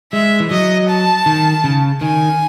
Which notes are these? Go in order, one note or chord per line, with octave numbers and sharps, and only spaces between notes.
G#3 E5
E3
F#3 D#5
A5
D#3
C#3
D#3 G#5